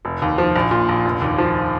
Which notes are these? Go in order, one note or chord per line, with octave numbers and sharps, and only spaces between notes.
F1
D#2
F3
A#1
A#2
A#1
F1
D#2
F3